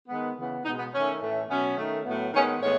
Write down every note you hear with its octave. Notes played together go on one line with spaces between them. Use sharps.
D#3 G#3 B3
C#3 E3 B3
B2 G#3 B3 D#4
B3
D#3 A3 C#4
A2 E3 A3
B2 F#3 B3 C#4
D#3 A3
A2 F#3 B3
D#3 G#3 B3 C#4
A2 E3 G#3 B3 C#5